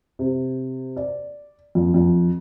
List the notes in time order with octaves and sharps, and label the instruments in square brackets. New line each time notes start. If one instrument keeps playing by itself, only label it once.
[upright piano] C3
D5
F2
F2